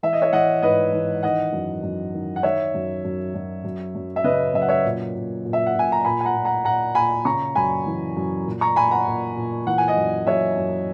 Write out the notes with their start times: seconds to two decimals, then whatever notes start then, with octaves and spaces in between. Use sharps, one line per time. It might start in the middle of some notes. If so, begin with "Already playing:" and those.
0.03 E3 E5
0.13 D#5
0.22 C#5 E5
0.33 E3 D#5 F#5
0.62 G#2 B4 D#5
0.93 E3
1.23 D#3 D#5 F#5
1.53 F#2
1.83 F#2
2.13 D#3
2.36 F#5
2.43 D#3 C#5 E5
2.74 F#2
3.04 F#2
3.35 F#2
3.64 F#2
3.95 F#2
4.16 E5
4.24 C#3 B4 D#5
4.54 F#2 E5
4.62 F#5
4.69 C#5 E5
4.85 A#2
5.15 A#2
5.45 A#2
5.53 E5
5.66 F#5
5.75 A#2 G#5
5.92 A#5
6.05 A#2 G#5 B5
6.21 G#5
6.25 F#5 A#5
6.35 A#2
6.45 F#5 A#5
6.65 A#2 F#5 A#5
6.95 A#2 G#5 B5
7.25 C#3 A#5 C#6
7.55 F#2 G#5 B5
7.86 E3
8.17 F#2
8.46 A#2
8.61 A#5 C#6
8.76 A#2 G#5 B5
8.91 F#5 A#5
9.07 A#2
9.36 A#2
9.67 E3 F#5
9.78 G#5
9.88 D#5 F#5
9.96 F#2
10.27 F#2 C#5 E5
10.58 F#2